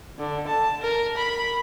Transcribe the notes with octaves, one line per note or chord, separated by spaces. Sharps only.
D3
A5
A#4
B5